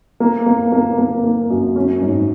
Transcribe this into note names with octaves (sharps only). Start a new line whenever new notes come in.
A#3
A#3
A#3
A#3
A#3
F#2
C#4
G#2